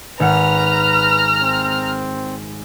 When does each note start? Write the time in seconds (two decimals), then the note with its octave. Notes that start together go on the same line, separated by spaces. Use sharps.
0.20 G#1 B4 F#5 A#5 F6 C#7
1.42 C4